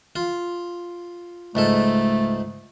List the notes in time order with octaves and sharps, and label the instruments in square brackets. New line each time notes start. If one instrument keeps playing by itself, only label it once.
[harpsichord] F4
[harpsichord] C#2 G#2 A4 [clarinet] A3